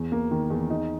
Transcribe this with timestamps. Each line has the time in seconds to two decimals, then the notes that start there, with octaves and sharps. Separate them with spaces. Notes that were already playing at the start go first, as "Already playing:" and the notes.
Already playing: E2
0.12 A#3
0.31 D#3
0.50 E2
0.70 D#4